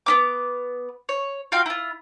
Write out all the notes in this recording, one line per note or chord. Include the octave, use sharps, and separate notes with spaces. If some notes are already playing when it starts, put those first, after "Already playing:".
B3 C#4 D6
C#5
F4 F#4 F5 G5
E4 F4